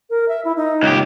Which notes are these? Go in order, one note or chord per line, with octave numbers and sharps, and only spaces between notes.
A#4
E5
E4
D#4
C#2 G4